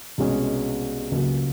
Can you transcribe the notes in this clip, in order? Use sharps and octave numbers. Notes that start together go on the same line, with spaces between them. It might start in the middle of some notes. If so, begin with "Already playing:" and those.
C2 B2 G#3 C#4
C#2 C#3 F#3 A#3